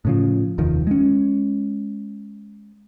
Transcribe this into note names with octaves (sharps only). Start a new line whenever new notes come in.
A2 C#3 F3
F1 D#2 D#3 F3
G#3 C#4